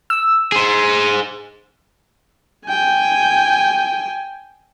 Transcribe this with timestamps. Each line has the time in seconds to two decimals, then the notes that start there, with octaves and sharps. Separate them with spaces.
0.10 E6
0.52 G#4 C5
2.68 G5 G#5